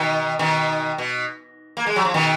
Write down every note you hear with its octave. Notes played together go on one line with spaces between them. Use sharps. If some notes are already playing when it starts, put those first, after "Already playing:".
Already playing: B2 D#3
B2 D#3
B2
A#3
G#3
F#3
F3
B2 D#3